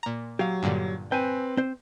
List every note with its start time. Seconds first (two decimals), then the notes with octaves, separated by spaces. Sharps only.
0.03 A#2 A#5
0.39 F#3 G4 F5
0.63 G2 A#2 D3
1.12 C4 B4 G5 G#5
1.57 C4 C5